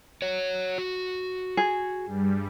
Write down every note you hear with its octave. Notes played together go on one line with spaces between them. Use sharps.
F#4 C#5
F#4
G#4
G2 G3